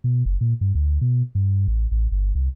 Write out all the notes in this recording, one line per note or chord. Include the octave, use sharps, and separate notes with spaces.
B2
F#1
A#2
G2
D2
B2
G2
A1
A1
G1
C2